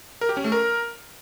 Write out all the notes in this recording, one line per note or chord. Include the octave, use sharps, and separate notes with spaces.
A#4
G4
C#4
A3
A#4